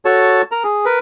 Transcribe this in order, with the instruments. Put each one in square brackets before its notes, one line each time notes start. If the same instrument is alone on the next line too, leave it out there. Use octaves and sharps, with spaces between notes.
[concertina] F#4 A4 C#5 A5
A#4 A#5
G#4
A#4 B4